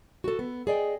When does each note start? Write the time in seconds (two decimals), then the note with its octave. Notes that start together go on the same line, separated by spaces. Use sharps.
0.24 F#4 A4
0.39 B3
0.67 G#4 D5 D#5 G5